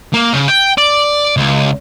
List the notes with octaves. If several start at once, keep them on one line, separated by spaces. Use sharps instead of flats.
A#3
C#3
G5
D5
C#2